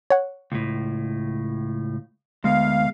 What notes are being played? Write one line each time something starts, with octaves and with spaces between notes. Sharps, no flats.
C#5 F#5
C#2 A2
D2 G#3 B3 F5